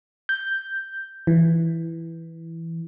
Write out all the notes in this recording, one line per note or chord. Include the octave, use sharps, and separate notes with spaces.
G6
E3